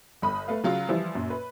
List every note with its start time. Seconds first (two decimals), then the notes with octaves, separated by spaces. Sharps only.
0.22 G1 B5 D#6
0.48 A3 B4 F5
0.64 C#3 F#3 F4
0.88 E3 F3 G3 E4
1.15 F#2 A#2
1.30 B4